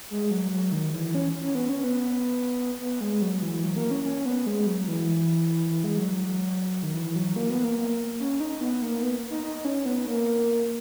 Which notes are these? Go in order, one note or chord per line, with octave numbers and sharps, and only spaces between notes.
G#3
F#3
F#3
D#3
E3
C#4
C#4
B3
C#4
B3
B3
G#3
F#3
E3
F#3
A#3
C#4
C#4
B3
G#3
F#3
E3
E3
G#3
F#3
D#3
E3
F#3
A#3
B3
A#3
A#3
C#4
D#4
B3
A#3
B3
D#4
D#4
C#4
B3
A#3